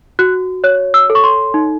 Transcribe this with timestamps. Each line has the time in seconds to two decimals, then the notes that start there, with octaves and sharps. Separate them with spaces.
0.19 F#4 F#6
0.64 C#5 F#6
0.94 E6
1.10 A4
1.15 C#6
1.24 C6
1.54 D#4